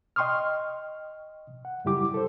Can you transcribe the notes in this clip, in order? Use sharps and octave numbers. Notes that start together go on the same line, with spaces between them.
D#5 G5 C6 C#6 D#6 F6
F#5
F#2 C#3 G3 E4 G4 D6
A4 C5